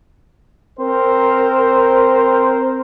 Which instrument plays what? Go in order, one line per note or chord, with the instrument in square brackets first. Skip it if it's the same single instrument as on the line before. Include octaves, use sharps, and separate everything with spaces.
[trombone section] C4 A#4 C5